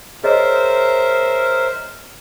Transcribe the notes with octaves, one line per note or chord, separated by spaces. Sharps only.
G#4 A#4 C5 C#5 D#5 E5